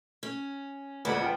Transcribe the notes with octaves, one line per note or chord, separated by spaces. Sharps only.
C#4
D2 A#2 G#3 B3
F3 G5